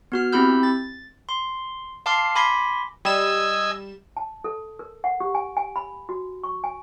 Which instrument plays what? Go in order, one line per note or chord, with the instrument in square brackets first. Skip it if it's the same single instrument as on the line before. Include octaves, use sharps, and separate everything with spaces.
[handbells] B3 F#4 F6
C4 E4 G4 B5 E6 G6
A6
C6
F5 A5 C6 D6 F6 C7
G#5 B5 C6 D6 A#6 B6
[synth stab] G3 E7 [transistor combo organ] D#5 G#5 [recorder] E6
[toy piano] A5
A4
A#4
F#5
G4
G#5
G#5
B5
F#4
C#6
G#5